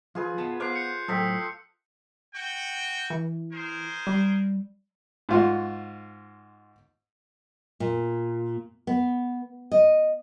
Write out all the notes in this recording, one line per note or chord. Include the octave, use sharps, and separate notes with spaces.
F3 F4 G#4 B4
B3 A5
B3 C5 F5 D6 F#6 C7
F#6 G6 C#7
A2 F#3 A4 C5 G5 D#6 E6 B6
F#4 G5
E3
G#4 A#4 C5
G3
G#2 F4 F#4
A#2
B3
D#5